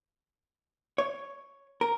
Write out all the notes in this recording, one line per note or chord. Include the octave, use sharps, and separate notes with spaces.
C#5
A#4